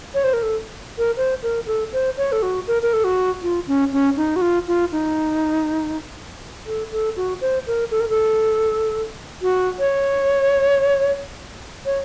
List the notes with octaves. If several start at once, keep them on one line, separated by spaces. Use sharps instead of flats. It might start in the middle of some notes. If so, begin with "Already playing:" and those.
C#5
C5
A#4
A4
A#4
C5
A#4
A4
C5
C#5
A4
F#4
A#4
A#4
A4
F#4
F4
C#4
C#4
D#4
F#4
F4
F4
D#4
A4
A4
F#4
C5
A#4
A4
A#4
A4
F#4
C#5
C#5